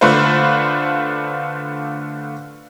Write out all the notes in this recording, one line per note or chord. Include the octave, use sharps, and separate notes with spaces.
D3 A3 D4 F4 B4 C5